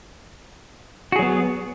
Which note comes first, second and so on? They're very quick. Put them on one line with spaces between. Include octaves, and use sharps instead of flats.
F#4 G#4 F#3 B3